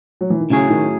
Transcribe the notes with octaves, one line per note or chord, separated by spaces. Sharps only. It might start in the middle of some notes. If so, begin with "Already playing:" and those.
F#3
E3
D#3
A2 C#3 F#3 C#4 G#4
D#3